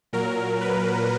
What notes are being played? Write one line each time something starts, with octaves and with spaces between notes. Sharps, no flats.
A#2 F#3 A#4
B4